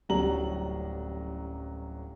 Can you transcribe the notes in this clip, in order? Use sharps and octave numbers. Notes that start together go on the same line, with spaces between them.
D1 A1 F#3 G3 A#5 F#7